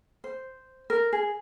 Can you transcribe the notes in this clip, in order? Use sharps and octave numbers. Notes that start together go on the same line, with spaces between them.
C5
A#4
G#4